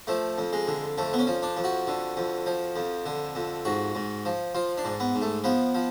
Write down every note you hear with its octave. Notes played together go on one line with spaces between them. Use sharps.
F3 A3
F2
G#3
D3
F2 A3
B3
C#4
F3
D4
F2
F#4
D3
F2
F3
F2
D3
F2
G#2 F#4
G#2
F3
F3 F4
D4
G#2
B3
G#2
A3
F3 B3
F3